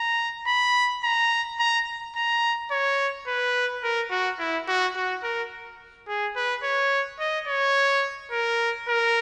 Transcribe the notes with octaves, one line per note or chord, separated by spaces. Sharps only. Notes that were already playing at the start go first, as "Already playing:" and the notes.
Already playing: A#5
B5
A#5
A#5
A#5
C#5
B4
A#4
F#4
E4
F#4
F#4
A#4
G#4
B4
C#5
D#5
C#5
A#4
A#4